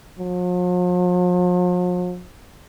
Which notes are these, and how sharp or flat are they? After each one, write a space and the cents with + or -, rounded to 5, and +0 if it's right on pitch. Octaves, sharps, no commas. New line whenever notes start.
F3 +45